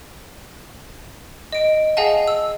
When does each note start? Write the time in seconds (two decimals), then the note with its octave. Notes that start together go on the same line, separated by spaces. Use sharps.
1.52 D#5 D7
1.97 G#4 D#5 F5 F#5 G#5 A5
2.28 E6